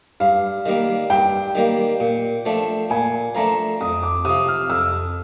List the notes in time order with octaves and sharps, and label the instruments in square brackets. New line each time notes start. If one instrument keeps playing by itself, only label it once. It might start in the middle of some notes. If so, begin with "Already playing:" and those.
[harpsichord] G2 [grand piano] F5
[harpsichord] D#3 G3 A#3
[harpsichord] G2 [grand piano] G5
[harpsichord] D#3 G3 A#3
A#2
F3 A3 D4
[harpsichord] A#2 [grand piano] G#5
[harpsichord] F3 A3 D4 [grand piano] A#5
[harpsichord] F2 [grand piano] D#6
[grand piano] D6
[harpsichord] C3 F3 [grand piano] D#6
[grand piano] F6
[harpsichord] F2 [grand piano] E6